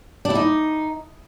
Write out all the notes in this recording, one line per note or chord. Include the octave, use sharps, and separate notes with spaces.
D4
E4
D#4